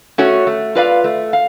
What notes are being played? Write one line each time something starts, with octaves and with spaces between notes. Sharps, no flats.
A3 C#4 F#4 C#5
A3
F4 B4 D5 F5
A3
F5